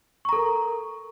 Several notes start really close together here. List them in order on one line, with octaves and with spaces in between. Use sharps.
C#6 A#5 A4 A#4